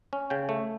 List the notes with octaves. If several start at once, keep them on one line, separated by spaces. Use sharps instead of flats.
C#4
C#3 G5
A3